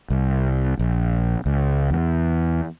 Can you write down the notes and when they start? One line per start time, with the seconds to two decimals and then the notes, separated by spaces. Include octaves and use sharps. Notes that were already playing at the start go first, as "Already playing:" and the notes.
0.10 C2
0.79 A#1
1.46 C#2
1.91 E2